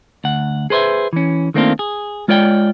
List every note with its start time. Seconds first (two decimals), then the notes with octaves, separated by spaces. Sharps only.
0.24 D2 F#5
0.70 G#4 B4 C5 D#5 E5
1.13 E3 C#4
1.54 D#3 A3 A#3 C4 D4 F4
1.79 G#4
2.28 G#3 F4 C#5 D5 E5 G5